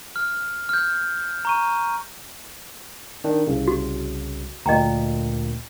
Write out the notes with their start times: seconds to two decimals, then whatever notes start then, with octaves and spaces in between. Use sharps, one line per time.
0.16 F6
0.69 F6 G6
1.45 A#5 C#6 D#7
3.24 D#3 D4
3.47 C2 C#3
3.68 F#4
4.66 D2 A#2 D#5 G5 A#5